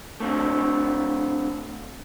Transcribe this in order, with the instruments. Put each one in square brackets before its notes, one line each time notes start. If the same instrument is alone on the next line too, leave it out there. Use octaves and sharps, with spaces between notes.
[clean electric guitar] A3 C4 D4